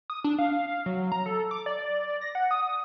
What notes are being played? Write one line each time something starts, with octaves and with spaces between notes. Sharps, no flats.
D#6
D4
F5
F#3
A#5
A4
D6
D5
A#6
F#5
D#6